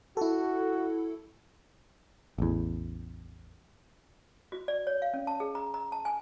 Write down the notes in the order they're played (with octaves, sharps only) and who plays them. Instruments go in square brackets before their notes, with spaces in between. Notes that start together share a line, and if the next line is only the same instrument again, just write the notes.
[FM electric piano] E4 A4 [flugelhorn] F#4
[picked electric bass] A1 E2
[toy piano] F#4
D5
C#5
F5
C#4
A5
G#4
A#5
A#5
A5
G#5